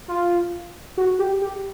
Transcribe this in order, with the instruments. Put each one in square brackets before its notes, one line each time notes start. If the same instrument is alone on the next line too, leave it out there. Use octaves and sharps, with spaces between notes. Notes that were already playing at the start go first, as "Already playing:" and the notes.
[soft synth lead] F4
F#4
G4
G4